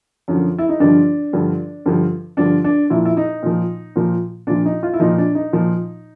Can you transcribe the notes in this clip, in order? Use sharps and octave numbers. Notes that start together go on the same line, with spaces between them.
F#2 D3 F3
E4
D#4
G2 D3 F3 D4
G2 D3 F3
G2 D3 F3
G2 D3 F3 D4
D4
A#2 F3 E4
E4
D#4
A#2 F3
A#2 F3
A#2 F3 D4
D#4
F4
E4
A#2 F3 D#4
D4
D#4
A#2 F3